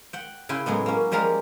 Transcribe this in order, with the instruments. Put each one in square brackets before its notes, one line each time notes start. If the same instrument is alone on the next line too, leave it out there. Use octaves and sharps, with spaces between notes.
[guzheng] F#5 G5
C#3 E4 G5 G#5 C6
A2 F#3 G#3 B3
A#3 C#4
F3 G3 G#3 A#4 A#5